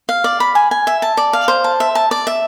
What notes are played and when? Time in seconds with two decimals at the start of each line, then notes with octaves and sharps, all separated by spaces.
0.09 F5
0.24 D5
0.40 B5
0.55 G#5
0.71 G#5
0.87 E5
1.02 A5
1.17 D5
1.33 F5
1.48 C5
1.64 A5
1.80 E5
1.95 A5
2.11 D5
2.27 E5